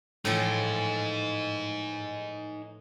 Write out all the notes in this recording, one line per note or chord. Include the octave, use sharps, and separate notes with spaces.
A2 E3 F3 D#4 G#5